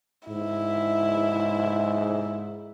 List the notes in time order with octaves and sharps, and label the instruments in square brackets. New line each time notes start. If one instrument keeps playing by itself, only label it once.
[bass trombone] G#2 [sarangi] E4